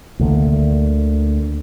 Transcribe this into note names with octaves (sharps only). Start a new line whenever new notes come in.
D2 D3 A#3